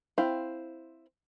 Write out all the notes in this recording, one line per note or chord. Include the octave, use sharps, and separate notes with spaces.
C4 E4 C5 F5